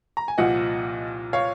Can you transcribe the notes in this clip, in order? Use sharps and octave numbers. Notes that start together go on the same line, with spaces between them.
A#5
G#5
C2 A#2 F3 D#5 F#5
C#5 F5